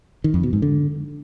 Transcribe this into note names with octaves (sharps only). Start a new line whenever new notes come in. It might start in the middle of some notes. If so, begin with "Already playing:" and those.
D#3
F2
B2
G#2
D3